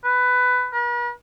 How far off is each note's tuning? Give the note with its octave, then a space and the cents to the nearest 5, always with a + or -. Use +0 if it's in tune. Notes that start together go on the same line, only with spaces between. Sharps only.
B4 +15
B4 -45